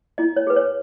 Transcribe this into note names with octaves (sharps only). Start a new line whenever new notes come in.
E4 D#5
C#5
G#4 B4
C#5